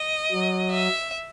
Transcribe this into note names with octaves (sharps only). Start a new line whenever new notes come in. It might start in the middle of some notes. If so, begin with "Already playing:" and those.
Already playing: D#5
F#3
E5